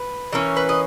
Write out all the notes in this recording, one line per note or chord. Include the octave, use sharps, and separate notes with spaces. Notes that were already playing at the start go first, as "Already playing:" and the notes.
Already playing: B4
E3 A#3 C#4
B4
D#5